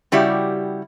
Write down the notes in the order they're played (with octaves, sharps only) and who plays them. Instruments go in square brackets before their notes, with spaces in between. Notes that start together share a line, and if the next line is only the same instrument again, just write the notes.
[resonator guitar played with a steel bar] C#3 G3 E4 F#4 G4 D5